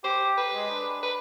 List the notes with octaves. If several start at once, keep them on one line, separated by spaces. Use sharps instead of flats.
G4 C5
B4
G#3
D4
B4